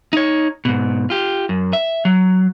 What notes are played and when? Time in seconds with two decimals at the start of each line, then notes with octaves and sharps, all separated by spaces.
0.13 D#4 C#5
0.65 G#2 B2
1.10 F4 G4
1.49 F#2
1.73 E5
2.05 F#3